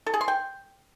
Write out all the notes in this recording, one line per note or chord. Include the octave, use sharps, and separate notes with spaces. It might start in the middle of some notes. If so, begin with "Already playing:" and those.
A4
G#4
C6
G5